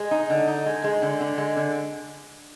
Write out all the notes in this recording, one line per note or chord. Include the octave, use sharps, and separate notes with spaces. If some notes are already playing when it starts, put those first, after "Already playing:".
Already playing: G#3
D#4
D3
D#4
G#3
G#3
D3
D3
G#3
D3